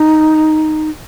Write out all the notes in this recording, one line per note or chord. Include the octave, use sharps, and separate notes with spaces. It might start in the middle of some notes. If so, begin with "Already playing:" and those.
Already playing: D#4